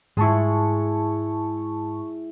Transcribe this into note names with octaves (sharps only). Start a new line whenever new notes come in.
G#2 G#3 E4 A5 C#6